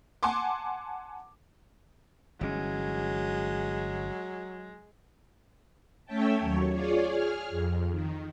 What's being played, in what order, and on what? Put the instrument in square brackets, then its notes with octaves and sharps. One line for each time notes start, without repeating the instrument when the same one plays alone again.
[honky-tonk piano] F#5 G#5 A5 C6 D6
[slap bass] G1 E3 C#4 [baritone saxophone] F#3 [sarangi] G#3
[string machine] A3 C#4 C#5 E5 G5 A5
D#2 F#3 C#5
F4 G#4 C#5 D5
G#4 G#5 F6
F2
D#3